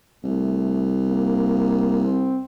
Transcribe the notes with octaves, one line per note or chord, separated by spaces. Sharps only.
C2 A3
A#3
C4